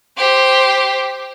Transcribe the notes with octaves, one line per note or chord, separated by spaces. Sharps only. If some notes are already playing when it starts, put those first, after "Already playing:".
G4 C5